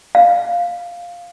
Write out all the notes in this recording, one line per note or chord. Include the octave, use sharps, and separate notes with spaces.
F5